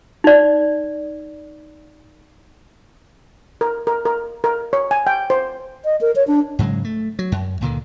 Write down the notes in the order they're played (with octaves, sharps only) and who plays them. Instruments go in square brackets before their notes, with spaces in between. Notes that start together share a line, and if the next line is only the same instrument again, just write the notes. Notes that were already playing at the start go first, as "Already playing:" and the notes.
[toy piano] D#4 D5
[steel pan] A#4
A#4
A#4
A#4
C#5
G#5
G5
C5
[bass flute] D#5
A#4
C#5
D4
[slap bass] G#2 C#3 F#3 G#3
A3
F#3
F#2
C#2 A#2 D3 D#3